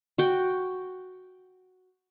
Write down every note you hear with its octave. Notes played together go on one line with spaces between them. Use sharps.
F#4 G5